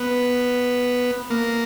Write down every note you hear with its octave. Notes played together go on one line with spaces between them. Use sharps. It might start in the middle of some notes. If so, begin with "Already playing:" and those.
Already playing: B3
A#3